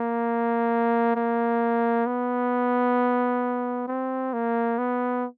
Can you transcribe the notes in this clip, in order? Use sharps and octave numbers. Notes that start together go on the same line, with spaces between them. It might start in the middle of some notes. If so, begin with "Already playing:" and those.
Already playing: A#3
A#3
B3
C4
A#3
B3